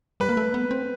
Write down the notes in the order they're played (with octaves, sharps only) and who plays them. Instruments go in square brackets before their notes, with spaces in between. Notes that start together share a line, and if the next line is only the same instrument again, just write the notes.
[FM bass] G3 [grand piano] B4
[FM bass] A#3
A3
B3
C4